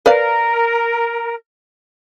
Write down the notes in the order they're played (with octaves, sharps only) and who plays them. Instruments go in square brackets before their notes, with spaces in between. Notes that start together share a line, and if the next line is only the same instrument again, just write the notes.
[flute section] A#4 [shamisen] B4 D5 F5